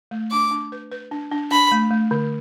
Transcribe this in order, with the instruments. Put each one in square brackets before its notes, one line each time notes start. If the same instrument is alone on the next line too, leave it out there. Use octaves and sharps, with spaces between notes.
[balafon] A3
[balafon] D4 [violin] D6
[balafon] D4
B4
B4
D4
D4
[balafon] D4 [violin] B5
[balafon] A3
A3
D3